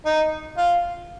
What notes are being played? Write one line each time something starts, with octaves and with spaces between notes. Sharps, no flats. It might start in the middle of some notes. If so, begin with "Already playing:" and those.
D#4
F4